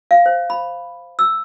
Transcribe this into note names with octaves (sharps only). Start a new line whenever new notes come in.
F5
C5
B5
E6